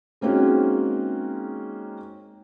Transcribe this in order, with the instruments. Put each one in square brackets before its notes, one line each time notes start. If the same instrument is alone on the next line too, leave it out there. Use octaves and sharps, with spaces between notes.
[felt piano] G#3 A#3 C4 C#4 D#4 F#4